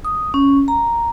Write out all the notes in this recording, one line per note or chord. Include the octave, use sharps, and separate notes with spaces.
D#6
C#4
A#5